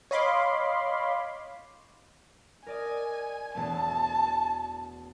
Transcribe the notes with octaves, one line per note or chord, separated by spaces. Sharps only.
C#5 D#5 F5 B5 C6 D6
A#4 D5 D#5 G#5
E1 A3 B3 A5